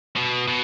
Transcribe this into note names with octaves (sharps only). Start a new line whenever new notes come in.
B2
B2